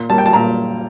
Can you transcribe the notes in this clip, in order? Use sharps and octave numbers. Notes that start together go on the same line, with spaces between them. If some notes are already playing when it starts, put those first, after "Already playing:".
Already playing: A#2
G3 A#3 A5
G5
A5
A#2 A#5